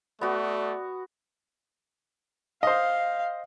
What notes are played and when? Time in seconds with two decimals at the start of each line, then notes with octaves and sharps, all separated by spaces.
0.21 A3 B3 F#4 D5
2.63 C5 D#5 F5